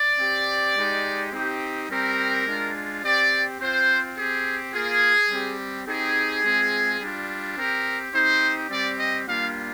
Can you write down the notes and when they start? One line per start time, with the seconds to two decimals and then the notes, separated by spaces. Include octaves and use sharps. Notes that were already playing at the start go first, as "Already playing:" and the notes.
Already playing: D5
0.19 C4 G4
0.77 G#3 D#4 G4
1.33 C4 D#4 G4
1.89 G3 C4 G4 A#4
2.46 G#3 D4 F4
3.03 C4 G4 D5
3.60 C4 F4 C5
4.16 C4 G4 G#4
4.73 A#3 F4 G#4
5.30 G3 C4 G4
5.86 C4 D#4 G4 G#4
6.44 G#3 C4 F4
7.00 G3 D4 F4
7.56 C4 G4 A#4
8.13 C4 D#4 G4 C5
8.70 G3 C4 G4 D5
8.98 D#5
9.27 G3 A#3 D4 F4 F5